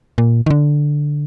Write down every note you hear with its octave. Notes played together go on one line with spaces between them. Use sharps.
A#2
D#3
D3